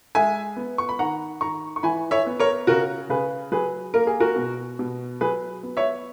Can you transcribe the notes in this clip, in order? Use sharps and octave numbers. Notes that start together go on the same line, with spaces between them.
G#3 E5 G#5
B3
C#6
B5
D#3 F#5 A#5
D#3 A#5 C#6
C#6
E3 G#5 B5
C#5 E5
B3
A#4 C#5
C#3 F#4 A#4
C#3 G#4 B4
F#3 G#4 B4
A#3 A#4
G#4
F#4 A#4
B2
B2
F#3 G#4 B4
B3
C#5 E5